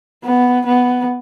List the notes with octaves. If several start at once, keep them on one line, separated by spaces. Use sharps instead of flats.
B3
B3